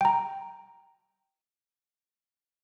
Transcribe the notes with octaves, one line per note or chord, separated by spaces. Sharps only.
G5 A#5